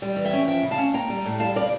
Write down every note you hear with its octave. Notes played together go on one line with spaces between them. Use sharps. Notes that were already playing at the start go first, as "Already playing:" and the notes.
G3
E3
E5 G5
C#4
F3 E5 G5
C#3
F5 A5
C#4
A#3 G5 A#5
G3
A2
G3 F5 A5
C#3 D5 F5